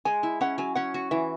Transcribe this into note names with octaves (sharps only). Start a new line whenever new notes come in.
G#3 G#5
E4
C#4 F#5
F#3 G#5
C#4 F#5
F#4
E3 E5